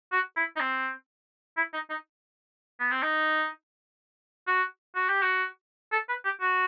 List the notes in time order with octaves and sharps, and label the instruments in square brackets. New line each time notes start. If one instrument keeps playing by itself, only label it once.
[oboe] F#4
E4
D#4
C4
E4
D#4
D#4
B3
C4
D#4
F#4
F#4
G4
F#4
A4
B4
G4
F#4